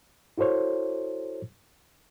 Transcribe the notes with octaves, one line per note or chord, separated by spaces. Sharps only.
E4 F#4 A4 C5 C#5